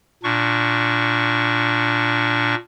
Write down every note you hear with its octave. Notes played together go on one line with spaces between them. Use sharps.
A#2 D4 C#6